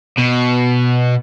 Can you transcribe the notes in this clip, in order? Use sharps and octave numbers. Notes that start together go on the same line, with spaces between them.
B2